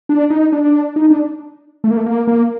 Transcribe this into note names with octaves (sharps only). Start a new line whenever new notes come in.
D4
D#4
D4
D#4
D4
A3
A#3
A3
A#3
A#3